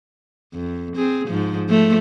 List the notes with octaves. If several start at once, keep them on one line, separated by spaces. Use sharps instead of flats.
F2
C4 G#4
G#2 F3
F3 A3